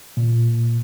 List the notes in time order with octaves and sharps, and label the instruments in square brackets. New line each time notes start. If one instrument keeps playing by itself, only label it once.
[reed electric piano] A#2